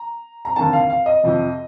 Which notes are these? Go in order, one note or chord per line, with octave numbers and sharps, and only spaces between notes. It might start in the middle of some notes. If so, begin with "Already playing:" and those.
Already playing: A#5
A#5
F1 D#2 D3 A5
F5
F5
D#5
F2 C3 F3